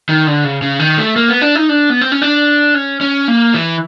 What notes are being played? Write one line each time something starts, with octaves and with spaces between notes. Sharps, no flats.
D#3
D3
C#3
C#3
D#3
A3
A#3
B3
D4
D#4
D4
B3
C4
C#4
D4
C#4
C#4
A#3
E3